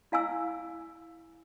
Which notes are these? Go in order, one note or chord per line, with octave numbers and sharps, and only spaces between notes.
E4 F5 G#5 E6